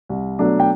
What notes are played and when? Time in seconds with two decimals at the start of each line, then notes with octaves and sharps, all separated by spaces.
0.09 C2
0.39 B2 F#3 A3 D4
0.60 G5